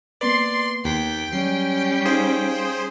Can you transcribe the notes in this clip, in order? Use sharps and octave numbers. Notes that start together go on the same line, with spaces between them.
A#3 B3 B4 D5 C6 C7
D#2 G5 B6
F#3 G3 C#4 C7
D#4 G#4 C5 F5